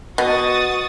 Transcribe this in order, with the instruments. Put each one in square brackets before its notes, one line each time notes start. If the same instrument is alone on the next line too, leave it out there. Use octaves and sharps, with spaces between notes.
[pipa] B2 [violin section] F#4 D#6 A6